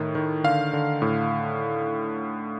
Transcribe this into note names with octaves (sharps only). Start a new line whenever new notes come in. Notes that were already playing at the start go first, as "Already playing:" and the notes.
Already playing: A2 D#3
D#3
D3 F5
D3
A2